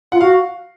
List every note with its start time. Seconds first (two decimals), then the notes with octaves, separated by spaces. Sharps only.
0.12 F4 F#5
0.21 F#4 F5